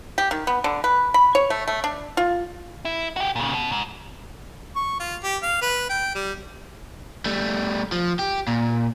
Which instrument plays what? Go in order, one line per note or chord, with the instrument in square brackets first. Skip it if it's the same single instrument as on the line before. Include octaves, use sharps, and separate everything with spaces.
[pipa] G4
D#3
B3
D3
B4
B5
C#5
A3
A3
D4
F4
[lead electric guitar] E4
F#4 G4
A#2 C#3
B2
G#2
[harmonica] C#6
F4
G4
F5
B4
G5
G3
[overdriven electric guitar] G3 A3
F3
G4
A#2